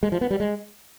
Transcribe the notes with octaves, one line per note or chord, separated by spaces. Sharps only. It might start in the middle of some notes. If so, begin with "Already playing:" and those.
G#3
F3
B3
G3
G#3